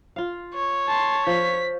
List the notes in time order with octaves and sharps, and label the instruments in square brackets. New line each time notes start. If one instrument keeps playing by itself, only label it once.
[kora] F4 F5
[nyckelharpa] C#5
[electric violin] A5 C6
[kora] F3 [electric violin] B6